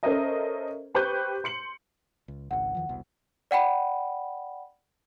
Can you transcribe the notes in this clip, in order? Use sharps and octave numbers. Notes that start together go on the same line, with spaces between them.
C#4 A4 A#4 C5 D#5 E5
G4 B4 C5 C#6 G6
C6 C#7 F#7
C#2
G#1 C#2 F#5
E2 D#3 F3
E1 C2 B2
D5 F#5 G5 B5